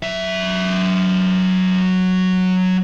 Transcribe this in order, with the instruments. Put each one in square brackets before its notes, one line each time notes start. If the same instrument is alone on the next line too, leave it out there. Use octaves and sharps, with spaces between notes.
[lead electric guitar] F#3 E5